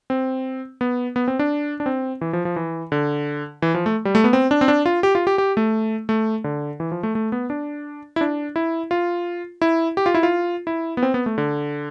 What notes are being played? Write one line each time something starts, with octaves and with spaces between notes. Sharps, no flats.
C4
B3
B3
C4
D4
D4
C4
E3
F3
F3
E3
D3
E3
F3
A3
G3
A3
B3
C4
D4
C4
D4
F4
G4
F4
G4
G4
A3
A3
D3
E3
F3
A3
A3
B3
D4
E4
D4
E4
F4
E4
G4
F4
E4
F4
E4
B3
C4
B3
A3
D3